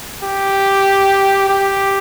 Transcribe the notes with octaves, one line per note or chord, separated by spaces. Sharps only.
G4
G4